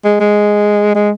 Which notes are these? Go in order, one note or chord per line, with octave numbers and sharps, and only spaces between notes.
G#3
G#3
G#3